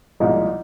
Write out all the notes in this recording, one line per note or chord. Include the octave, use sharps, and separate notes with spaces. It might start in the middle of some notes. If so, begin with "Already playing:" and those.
C2 A#2 F3 G#3 D#4